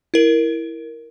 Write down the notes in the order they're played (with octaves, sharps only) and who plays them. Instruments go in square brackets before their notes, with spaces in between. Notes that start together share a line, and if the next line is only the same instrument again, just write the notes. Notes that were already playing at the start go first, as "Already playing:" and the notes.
[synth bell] E4 A#4